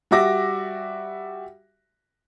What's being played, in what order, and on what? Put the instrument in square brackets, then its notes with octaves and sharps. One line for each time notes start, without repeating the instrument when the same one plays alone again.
[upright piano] G3 F#4 E5 D6 A#6